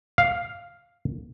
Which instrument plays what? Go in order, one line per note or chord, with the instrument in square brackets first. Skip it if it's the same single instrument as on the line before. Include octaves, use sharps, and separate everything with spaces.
[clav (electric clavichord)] F5